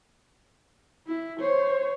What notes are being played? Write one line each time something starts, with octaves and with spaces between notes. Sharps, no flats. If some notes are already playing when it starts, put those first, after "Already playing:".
E4
C5 C#5